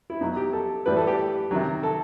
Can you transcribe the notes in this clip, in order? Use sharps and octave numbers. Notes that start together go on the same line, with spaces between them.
E4
B2 F#3 D#4
G4
A4
A2 E3 G3 B4
A4
G4
C3 D#3 F#3
A4